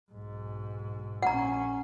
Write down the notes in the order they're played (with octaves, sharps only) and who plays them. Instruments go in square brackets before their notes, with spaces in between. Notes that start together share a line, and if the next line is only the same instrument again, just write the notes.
[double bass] B1 G#2
[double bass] A#1 C#4 [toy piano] F#5 A#5